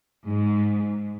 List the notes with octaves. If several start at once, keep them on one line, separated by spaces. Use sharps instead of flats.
G#2